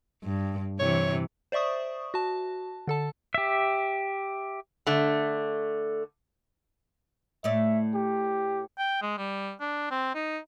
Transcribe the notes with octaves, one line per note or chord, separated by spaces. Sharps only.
G2
C3 E3 C#5
C5 D5 E5 C#6 D#6
F#4 A5
D3 A4 A5
G4 E5
D3 A3
A2 A3 D5 E5
G4
G5
G#3
G3
D4
C4
D#4